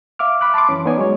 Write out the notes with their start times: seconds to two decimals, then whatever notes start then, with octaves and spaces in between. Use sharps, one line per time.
0.19 E5 F5 D6 F6
0.41 B5 D6 F#6
0.54 A5 B5 C6 D6
0.69 F#2 E3 C#4
0.85 B3 D#4 C#5 D5 G#5
0.98 F#3 G#3 C#5